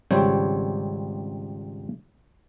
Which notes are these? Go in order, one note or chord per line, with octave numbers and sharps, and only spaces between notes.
G#1 C#2 G3 C4 C#5 G5